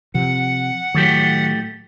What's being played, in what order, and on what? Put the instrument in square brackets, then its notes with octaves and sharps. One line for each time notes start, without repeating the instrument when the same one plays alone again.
[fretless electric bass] C3 F3 [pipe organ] F#5
[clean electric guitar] A2 A3 G4 [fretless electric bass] D#3 F#3